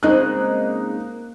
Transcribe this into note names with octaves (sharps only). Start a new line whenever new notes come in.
C#3 G#3 A#3 C4 D#4 F#6